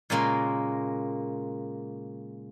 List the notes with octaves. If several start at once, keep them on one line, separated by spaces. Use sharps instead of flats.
A#2 C#3 G#3 A#3 C6